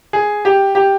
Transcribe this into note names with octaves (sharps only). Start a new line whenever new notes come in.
G#4
G4
G4